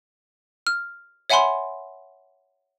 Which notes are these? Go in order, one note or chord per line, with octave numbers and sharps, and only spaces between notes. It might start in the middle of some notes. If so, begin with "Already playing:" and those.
F6
C#5 E5 F#5 G#5 B5 C6